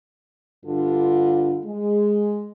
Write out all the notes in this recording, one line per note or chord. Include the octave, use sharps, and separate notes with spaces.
G2 D3 G3 F4
G#3